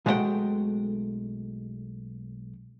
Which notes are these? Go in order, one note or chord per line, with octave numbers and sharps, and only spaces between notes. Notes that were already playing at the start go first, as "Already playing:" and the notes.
B1 G#3 A3 A4 F#5 G5